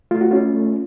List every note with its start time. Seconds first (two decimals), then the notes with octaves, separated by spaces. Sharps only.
0.11 A3 F4
0.21 F#4
0.31 C#4 F4
0.54 A3